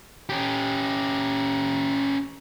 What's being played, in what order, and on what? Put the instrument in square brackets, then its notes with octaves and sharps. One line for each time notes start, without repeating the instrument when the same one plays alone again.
[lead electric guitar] C#4 G4